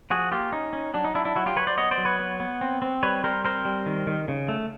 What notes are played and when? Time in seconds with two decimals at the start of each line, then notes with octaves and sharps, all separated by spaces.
0.10 F3 F#4 G#4
0.31 A#3 F4 G4
0.52 C#4 D#4
0.73 C#4
0.94 F#3 D4
1.04 D#4
1.14 F#3 D4 E4
1.25 D4 E4
1.36 F#3 E4 F#4
1.46 F4 G4
1.56 F#3 B4 C#5
1.67 C5 D5
1.77 B3 C#5 D#5
1.91 C5 D5
1.98 F#3
2.05 B4 C#5
2.19 B3
2.40 B3
2.61 C4
2.82 C4
3.03 G3 B4 C#5
3.23 G3 A#4 C5
3.45 C4 A#4 C5
3.65 G3
3.86 D#3
4.07 D#3
4.28 C#3
4.48 A3